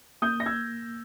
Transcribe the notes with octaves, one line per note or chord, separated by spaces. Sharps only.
A#3 D#6 G6
A#6
E6 G#6